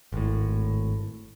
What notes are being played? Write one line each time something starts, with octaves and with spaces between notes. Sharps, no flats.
G#1 A2